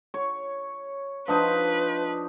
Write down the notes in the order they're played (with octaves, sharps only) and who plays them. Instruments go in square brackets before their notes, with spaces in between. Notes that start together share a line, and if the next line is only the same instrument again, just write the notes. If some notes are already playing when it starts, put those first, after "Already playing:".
[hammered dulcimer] C#5
[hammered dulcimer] F3 D4 D#4 [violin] B4